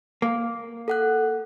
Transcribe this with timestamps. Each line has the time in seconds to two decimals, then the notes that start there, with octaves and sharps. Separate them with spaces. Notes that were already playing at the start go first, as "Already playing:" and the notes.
0.22 A#3
0.88 A4 F#5 F#6